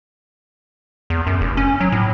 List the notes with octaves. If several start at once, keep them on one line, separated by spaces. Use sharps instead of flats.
E2
F#2
F1
C#4
F#3
A2